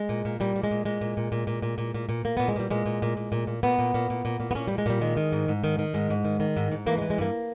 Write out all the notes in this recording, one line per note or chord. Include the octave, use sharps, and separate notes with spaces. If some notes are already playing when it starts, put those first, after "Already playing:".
Already playing: G#3
A#2
A#2
A#2 G3
A#2
G#3
A#2
A#2 G#3
A#2
A#2
A#2
A#2
A#2
A#2
A#2
A#2
A#2 A#3
A#2 B3
G#3
A#2 G3
A#2 G#3
A#2
A#2
A#2
A#2
A#2
A#2 B3
A#2
A#2
A#2
A#2
A#2
B3
A#2 C#4
A#2 G3
G#3
A#2 G3
D#3 G#3
D#3
G#2
G#2
D#3
D#3
G#2 G#3
G#2
D#3
D#3
G#2
G#2
E3 A#3
G#3
E3
G#3
G2 A#3